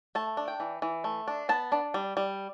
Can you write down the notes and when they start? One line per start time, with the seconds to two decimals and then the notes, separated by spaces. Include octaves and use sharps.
0.15 A3 A5
0.37 D4
0.48 G5
0.60 E3
0.82 E3
1.04 A3
1.28 D4
1.49 B3 A5
1.72 D4
1.94 G3
2.17 G3